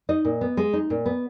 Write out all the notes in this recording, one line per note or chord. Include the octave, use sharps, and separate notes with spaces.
D#4 D#5
A#2
B3
G#3
D#4
A#2
B3